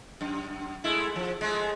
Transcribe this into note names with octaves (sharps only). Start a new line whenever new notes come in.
F#2
G#3 A3 E4
F3
G#3 A3